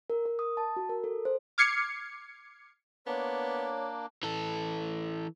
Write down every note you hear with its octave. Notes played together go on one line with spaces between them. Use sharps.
A#4
A#4
D#6
A5
F#4
A#4
A4
C5
D6 F6 G#6 C7 C#7
A#3 B3 D4 C#5
E3 A4